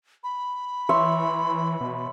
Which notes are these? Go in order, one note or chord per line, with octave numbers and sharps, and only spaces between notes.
B5
E3 C#5 E5 C6
B2